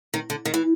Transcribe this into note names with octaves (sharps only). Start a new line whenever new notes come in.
D#3
D3
D#3
E3